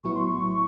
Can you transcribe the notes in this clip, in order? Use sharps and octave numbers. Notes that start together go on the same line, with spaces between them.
A#1 A2 F#3 B3 E4 C#6
C6
C#6